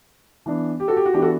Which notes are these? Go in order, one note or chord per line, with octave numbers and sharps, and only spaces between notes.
E3 B3 D4
G4
F#4 A4
G4
F#4
E3 B3 D4 G4
F#4 A4